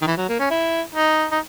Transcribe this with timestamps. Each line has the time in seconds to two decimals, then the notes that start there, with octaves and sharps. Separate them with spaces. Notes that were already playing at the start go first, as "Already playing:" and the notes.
0.02 D#3
0.07 E3
0.17 F#3
0.29 A#3
0.40 C#4
0.51 E4
0.95 D#4
1.32 D#4